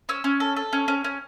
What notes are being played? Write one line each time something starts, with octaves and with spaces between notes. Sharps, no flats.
C#4 E6
C#4
A4
A4
C#4
C#4
C#4